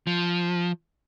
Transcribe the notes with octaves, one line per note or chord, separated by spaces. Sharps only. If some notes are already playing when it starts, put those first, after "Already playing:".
F3